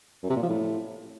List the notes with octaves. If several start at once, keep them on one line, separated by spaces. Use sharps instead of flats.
F#2
C3
A#2
F3
A2